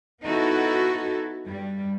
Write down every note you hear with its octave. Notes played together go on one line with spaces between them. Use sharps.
B3 D#4 E4 F#4 A4
G2 G3